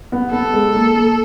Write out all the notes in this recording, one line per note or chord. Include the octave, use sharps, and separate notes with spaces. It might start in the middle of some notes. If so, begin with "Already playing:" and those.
B3
B3 A4
G#3
A#3
A#3